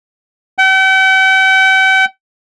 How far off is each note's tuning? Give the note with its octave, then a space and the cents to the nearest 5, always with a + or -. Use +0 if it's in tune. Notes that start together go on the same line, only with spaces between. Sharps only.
G5 -45